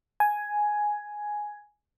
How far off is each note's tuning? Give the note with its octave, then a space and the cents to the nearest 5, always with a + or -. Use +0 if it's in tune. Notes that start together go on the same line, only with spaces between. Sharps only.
G#5 +5